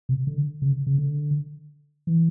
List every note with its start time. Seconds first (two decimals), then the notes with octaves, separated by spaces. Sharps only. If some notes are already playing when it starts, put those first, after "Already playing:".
0.09 C3
0.27 D3
0.62 C#3
0.87 C#3
0.98 D3
2.07 E3